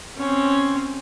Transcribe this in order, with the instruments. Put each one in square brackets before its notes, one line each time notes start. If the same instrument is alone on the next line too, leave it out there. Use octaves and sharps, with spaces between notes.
[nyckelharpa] C4 C#4